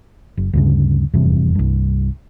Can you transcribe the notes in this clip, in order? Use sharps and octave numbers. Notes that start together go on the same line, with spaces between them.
F#1
D2 G2 C#3
F1 E2 G2 C3
C2 G2